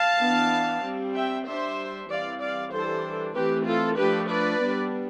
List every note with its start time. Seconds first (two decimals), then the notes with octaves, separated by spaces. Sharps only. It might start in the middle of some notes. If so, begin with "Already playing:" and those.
Already playing: F5 A5
0.21 E3 B3 D4
0.84 G3 C4
1.15 E5 G5
1.46 G3 D4 C5 E5
2.09 E3 G3 C4 D5 F5
2.41 D5 F5
2.72 E3 G3 D4 A4 C5
3.34 E3 A3 C4 G4 B4
3.66 F4 A4
3.98 F3 A3 D4 G4 B4
4.29 B4 D5
4.60 G3 B3 D4